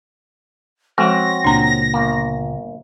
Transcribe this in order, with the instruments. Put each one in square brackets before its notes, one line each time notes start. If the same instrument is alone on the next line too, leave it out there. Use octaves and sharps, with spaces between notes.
[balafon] F3 G#3 A4 [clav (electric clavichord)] C4 C#4 F#4 [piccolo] A#6
[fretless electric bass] C#2 A#2 [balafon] D4 A#5
[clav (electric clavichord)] G1 A#3